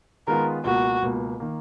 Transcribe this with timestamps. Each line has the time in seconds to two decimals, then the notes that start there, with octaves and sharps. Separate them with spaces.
0.27 D#3 G#3 B3 F4 A#4
0.65 C#2 B2 A#3 F#4
1.02 C#2 B2 A#3
1.40 D#3 A#3